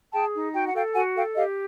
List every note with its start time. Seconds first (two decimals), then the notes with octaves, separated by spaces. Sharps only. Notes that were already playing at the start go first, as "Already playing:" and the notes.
0.13 G#4 G5 A5
0.34 D#4
0.54 F#4 G5
0.66 F#5
0.74 A4 F5 G5
0.94 F#4 F#5 G#5
1.16 A4 F5 G5
1.36 G4 D#5 F5